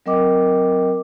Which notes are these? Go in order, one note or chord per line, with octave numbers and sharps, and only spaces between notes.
F#3 C4 A#4 D#5 G5 D6